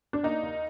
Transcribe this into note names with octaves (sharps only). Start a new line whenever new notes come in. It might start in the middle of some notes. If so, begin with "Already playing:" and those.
D4
A#3 D#4
D#2